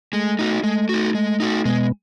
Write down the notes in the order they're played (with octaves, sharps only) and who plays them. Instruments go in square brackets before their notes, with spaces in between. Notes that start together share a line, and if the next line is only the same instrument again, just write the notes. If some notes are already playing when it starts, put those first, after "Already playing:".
[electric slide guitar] G#3 [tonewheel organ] A3
[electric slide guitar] D#4 F#4
[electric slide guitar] G#3 [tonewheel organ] A3
[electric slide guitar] D#4 F#4
G#3
D#4 F#4
[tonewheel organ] B2 B3 [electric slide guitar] G#3